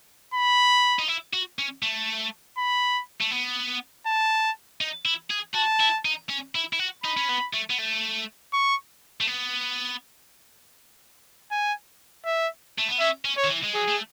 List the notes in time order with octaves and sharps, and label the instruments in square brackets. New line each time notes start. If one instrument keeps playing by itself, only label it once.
[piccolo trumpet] B5
[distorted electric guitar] D#4
E4
F#4
C#4
A3
[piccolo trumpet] B5
[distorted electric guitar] A3
B3
[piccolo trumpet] A5
[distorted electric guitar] D#4
E4
G#4
[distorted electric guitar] F#4 [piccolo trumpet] A5
[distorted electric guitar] E4
D#4
C#4
E4
E4
F#4
[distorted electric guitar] D#4 [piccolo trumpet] B5
[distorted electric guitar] C#4
B3
A3
B3
A3
[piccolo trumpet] C#6
[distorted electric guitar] A3
B3
[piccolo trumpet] G#5
E5
[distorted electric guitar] A3
B3
[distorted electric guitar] C#4 [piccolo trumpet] E5
[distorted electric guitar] C#4
[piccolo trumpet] C#5
[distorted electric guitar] D#3
E3
G#3
[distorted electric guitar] F#3 [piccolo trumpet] G#4
[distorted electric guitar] A3